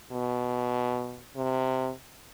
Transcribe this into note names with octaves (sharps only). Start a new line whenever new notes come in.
B2
C3